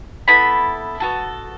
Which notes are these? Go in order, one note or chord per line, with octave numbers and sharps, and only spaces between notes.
B3 E4 A4 B5
B3 F#4 A4